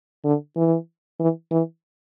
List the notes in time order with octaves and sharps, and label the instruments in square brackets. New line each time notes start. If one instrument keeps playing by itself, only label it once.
[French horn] D3
E3
E3
E3